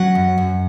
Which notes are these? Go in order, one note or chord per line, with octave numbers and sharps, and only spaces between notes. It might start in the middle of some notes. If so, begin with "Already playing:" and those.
Already playing: F#3 C#4 F#5
F#2
F#2